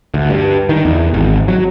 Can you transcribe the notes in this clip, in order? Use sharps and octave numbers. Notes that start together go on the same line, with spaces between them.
D2
G2
D#3
E2
G#1
F#3